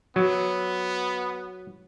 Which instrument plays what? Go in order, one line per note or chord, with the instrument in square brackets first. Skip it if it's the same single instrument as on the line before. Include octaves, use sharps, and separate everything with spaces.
[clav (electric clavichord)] F#3 [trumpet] B3